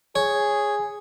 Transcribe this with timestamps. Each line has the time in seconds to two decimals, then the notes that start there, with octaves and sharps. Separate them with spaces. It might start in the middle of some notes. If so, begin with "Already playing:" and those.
0.16 G#4 C#5